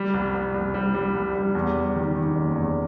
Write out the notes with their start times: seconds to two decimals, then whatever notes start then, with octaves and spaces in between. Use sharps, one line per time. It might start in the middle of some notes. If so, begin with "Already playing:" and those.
Already playing: G3
0.14 C2
0.34 C2
0.54 C2
0.74 G3
0.94 G3
1.14 C2
1.35 G3
1.55 E2
1.75 G3
1.95 D#3
2.15 D#3
2.35 F#1
2.55 E2